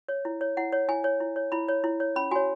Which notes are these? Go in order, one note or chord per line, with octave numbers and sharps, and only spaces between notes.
C#5
E4
C#5
E4 F#5
C#5
E4 G#5
C#5
E4
C#5
E4 B5
C#5
E4
C#5
C#4 B5
F#4 C#5 G#5